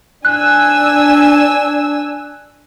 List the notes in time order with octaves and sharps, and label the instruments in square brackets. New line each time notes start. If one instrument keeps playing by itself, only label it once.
[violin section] D4 G#5 E6 [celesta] F#6